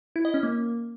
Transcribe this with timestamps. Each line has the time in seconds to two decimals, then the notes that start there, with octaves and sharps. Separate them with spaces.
0.16 E4
0.25 D#5
0.34 C#4
0.43 A#3